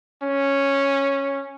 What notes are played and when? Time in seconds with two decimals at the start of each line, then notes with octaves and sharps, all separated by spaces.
0.23 C#4